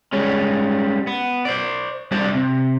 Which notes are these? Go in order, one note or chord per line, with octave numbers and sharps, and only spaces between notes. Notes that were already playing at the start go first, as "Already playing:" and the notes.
G3 G#3 C#4
B3
C5 D5
G3 D4 C5 D5 E5
C3